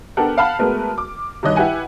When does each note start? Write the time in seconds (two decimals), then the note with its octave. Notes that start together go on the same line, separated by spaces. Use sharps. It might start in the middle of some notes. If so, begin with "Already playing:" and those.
0.17 B3 D4 G4 A4 A#4 F#5
0.38 F5 F#5 A5 B5 F6
0.59 G#3 A3 B3 F#4 A#4 B4
0.98 D6
1.43 G2 D#3 C#5 D#5 F#6
1.56 E4 G4 B4 F#5 G#5